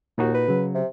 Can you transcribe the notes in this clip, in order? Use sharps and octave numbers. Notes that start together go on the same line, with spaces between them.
D#2 A#2 D#4 F#4
B4
C#3 F#3
C3